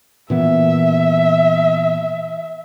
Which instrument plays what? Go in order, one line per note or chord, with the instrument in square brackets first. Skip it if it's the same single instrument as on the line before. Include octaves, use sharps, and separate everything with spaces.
[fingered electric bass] A#2 E3 B3 [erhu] E5